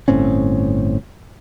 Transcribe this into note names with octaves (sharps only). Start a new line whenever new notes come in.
G1 A2 C4 C#4